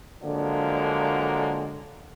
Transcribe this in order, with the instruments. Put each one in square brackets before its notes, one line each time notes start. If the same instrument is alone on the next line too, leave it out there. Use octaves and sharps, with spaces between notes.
[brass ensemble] D3 F3 F#3 G#3 A#3 D4